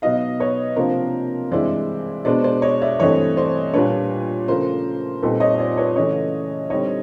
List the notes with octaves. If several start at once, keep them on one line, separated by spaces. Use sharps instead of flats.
B2 F#3 B3 D#4 D#5 F5
B4 C#5
C3 F3 A#3 D4 A#4 C5
G2 E3 G#3 C4 E4 C5 D5
B2 G#3 B3 D4 C5 D5
C5 D5
C#5 D#5
D5 E5
G2 E3 A3 C4 C#5 D#5
C5 D5
A#2 G3 A#3 D4 B4 C#5
C#3 F3 A3 A#4 C5
A#2 G3 C4 D#4 A4 B4
C#5 D#5
C5 D5
B4 C#5
C#3 E3 A3 C#4 C#5 D#5
D3 G3 C4 D#4 C#5 D#5